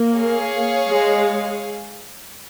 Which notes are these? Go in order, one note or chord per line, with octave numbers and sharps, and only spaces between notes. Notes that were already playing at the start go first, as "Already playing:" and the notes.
Already playing: A#3
G#4 C#5 F5
G#3